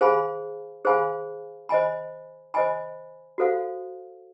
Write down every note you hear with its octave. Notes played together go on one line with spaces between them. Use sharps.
G#4 C5 F5 G#5 B5
G#4 C5 F5 G#5 B5
C5 D#5 G#5 B5
C5 D#5 G#5 B5
F#4 A4 C5 F5